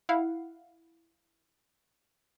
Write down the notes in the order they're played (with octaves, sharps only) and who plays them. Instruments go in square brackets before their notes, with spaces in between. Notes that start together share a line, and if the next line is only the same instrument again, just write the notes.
[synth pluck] E4 F5 F#5